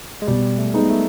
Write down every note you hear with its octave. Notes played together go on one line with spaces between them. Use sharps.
G#3
B2 G3
A3
G#3 B3 D#4
A3